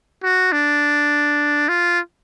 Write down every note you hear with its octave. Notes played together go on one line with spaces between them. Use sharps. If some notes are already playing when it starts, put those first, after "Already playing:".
F#4
D4
F4